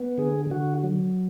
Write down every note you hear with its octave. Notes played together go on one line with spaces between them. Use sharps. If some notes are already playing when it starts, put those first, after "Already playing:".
Already playing: B3
D3 G#4
D3 F#4
F#3